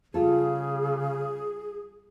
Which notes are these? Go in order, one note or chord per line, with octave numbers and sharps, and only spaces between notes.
C#3 G3 F4 G#4 A4